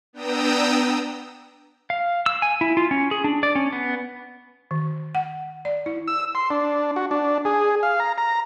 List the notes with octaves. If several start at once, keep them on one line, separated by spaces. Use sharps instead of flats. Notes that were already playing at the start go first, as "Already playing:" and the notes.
B3 D4 G5 A#5 D#6 E6
F5
E6
G#5
E4
F4
C#4
G#4
D4
D5
C#4
B3
D#3
F#5
D5
E4
E6
C6
D4
F#4
D4
G#4
F5
A#5
A#5